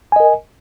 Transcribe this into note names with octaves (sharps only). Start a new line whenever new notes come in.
A#4 D#5 G#5